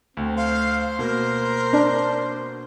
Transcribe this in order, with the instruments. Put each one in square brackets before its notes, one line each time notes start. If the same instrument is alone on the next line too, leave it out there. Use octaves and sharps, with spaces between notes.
[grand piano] D2 [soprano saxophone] C4
[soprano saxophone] C5 [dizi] F5
[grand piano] B2 A#3 [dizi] A#4
[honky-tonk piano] D4